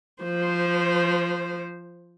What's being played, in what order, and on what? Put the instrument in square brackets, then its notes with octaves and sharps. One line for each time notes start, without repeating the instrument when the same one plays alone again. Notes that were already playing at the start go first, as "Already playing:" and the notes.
[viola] F3 C5